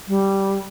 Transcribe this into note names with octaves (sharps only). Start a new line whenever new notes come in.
G3